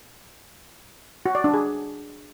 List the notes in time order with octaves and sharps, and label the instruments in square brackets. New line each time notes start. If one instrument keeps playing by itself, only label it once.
[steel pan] F#4
D5
D4
G#4